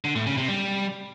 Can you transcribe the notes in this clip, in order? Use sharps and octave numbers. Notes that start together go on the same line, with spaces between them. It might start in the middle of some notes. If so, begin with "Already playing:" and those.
D3
A2
C#3
C3
G3